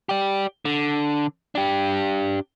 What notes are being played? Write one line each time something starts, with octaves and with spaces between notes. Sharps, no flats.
G4 D5
D3
D4 G4